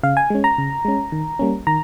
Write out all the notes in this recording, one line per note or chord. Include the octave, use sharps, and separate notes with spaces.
C#3 F5
G#5
G#3 C#4
A#5
C#3
G#3 C#4
D#3
G3 A#3 C#4
D#3 A#5